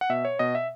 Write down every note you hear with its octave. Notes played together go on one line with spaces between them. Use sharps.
F#5
B2 E5
C#5
B2 D#5
E5